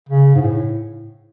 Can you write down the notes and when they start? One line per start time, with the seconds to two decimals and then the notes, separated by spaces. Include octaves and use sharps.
0.09 C#3
0.35 G#2
0.41 A2